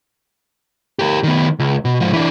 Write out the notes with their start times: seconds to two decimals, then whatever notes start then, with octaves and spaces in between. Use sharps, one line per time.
0.99 G4 A#4
1.23 D#3 B3
1.59 C#2
1.85 B2
2.00 G#2 F3
2.13 E3 D4